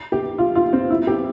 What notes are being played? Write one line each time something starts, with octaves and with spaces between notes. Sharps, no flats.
G4
F4
F4
C4
E4
G4